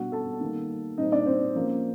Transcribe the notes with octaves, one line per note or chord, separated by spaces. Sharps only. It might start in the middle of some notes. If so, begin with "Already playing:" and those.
Already playing: B2 G3 B3 D4 F#4 F#5
A4 A5
D#3 G3 A#3
A#2 G3 C4 D#4 D#5
D4 D5
C4 C5
F3 A#3 C#4